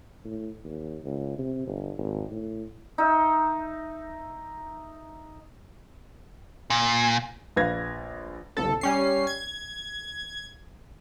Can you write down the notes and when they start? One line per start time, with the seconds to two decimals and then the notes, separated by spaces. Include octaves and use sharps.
0.24 A2
0.64 D#2
1.04 C#2
1.38 C3
1.67 G1
1.98 G#1
2.31 A2
2.98 D#4 E5
6.70 A#2
7.56 A#1 B4 F5 G#6 A#6
8.57 G1 C2 A4
8.81 G3 C#4 C7
9.27 G#6